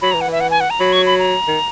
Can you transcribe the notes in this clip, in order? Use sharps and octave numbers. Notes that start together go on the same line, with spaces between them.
F#3 B5
A#5
E3
F#5
E3 E5
F#5
G#5
F#5
A#5
F#3 B5
C#6
B5
A#5
D#3